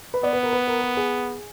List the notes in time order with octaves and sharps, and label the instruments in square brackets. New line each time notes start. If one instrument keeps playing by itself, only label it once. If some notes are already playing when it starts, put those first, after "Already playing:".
[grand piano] B4
[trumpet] B3 [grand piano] D5
[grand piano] B4
A#4
B4
A#4
A#4
G#4